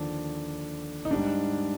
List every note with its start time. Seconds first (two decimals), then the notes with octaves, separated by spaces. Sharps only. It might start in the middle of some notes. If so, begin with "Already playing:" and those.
Already playing: D#2 D3 F3 D4
1.05 D#4
1.11 G#2 G3 D4